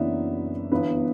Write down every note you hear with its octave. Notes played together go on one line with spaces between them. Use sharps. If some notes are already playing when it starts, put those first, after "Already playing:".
Already playing: F#1 F#2 E3 B3 D4 E5
G1 G2 E3 B3 B4